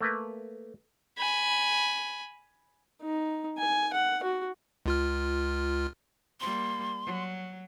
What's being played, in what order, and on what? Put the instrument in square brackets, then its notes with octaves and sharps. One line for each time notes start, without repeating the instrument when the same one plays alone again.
[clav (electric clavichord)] A3 A#3 A#4 B4
[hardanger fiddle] G#5 B5
[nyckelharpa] D#4
G#5
F#5
F#4
[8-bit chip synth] C#2 F4 F6
[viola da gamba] G3 A#3 [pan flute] C6
[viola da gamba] F#3